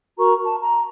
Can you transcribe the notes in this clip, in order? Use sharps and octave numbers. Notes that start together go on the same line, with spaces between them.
F#4 A#4 A#5 C#6
A5
A#5